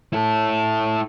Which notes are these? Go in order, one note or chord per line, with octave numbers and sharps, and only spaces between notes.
E4 A4